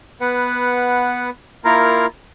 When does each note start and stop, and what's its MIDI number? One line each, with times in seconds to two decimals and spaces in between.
0.21 1.30 59
0.21 1.30 71
0.21 1.30 78
1.65 2.06 58
1.65 2.06 64
1.65 2.06 65
1.65 2.06 70
1.65 2.06 77
1.65 2.06 82